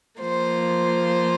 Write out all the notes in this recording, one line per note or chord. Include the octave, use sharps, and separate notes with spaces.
F3 A#3 F4 C5